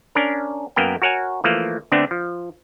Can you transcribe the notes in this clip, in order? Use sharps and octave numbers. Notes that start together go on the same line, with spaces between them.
C#4 D4 A#4
F#2 A#3 B3 A#4 G5
F#4 A#4 C#5 F#5 G#5
E3 F3 A3 A#3
D3 A3 B3 C4 D4
F3